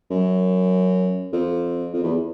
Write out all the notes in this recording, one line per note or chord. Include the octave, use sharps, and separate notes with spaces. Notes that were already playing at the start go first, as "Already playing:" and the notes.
F#2
F2
F2
E2